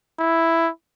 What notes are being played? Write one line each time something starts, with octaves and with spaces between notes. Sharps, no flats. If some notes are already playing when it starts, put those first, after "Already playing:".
E4